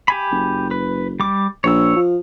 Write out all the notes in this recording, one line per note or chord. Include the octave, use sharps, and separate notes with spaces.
G4 G#5 B5
F#1
B4
G3 D6
A#1 C#5 E6
F3